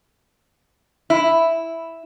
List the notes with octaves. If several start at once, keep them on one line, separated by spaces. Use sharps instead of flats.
E4